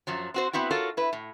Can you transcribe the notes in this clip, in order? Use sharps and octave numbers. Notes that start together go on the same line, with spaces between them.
F#2 F3 F#3
C4 F#4 C5
B3 C4 E4 F#4
F4 F#4 A4 A#4 C#5
E4 B4
A2